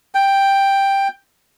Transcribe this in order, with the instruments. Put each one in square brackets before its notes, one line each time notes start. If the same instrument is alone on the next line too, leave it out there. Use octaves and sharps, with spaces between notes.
[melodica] G5